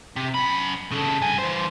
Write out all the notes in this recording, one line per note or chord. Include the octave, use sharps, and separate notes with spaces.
C3
F#2 B5
C#3 A4
G2 G#5
E3 C5